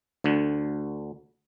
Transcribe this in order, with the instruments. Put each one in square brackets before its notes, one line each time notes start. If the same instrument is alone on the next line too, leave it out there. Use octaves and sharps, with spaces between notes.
[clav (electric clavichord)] D2 D3